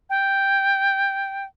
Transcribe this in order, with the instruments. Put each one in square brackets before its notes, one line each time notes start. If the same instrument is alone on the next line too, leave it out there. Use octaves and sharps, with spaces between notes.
[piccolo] G5